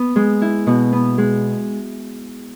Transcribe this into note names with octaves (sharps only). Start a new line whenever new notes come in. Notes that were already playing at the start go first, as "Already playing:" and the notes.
Already playing: B3
G#3
E4
B2
B3
G#3